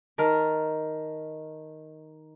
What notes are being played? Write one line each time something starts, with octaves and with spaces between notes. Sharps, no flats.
D#3 A#4 A5 F6